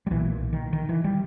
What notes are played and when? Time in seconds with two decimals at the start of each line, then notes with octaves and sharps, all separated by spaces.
0.07 G3
0.11 B1 A#2 E3
0.53 D#3
0.73 D#3
0.89 E3
1.04 G3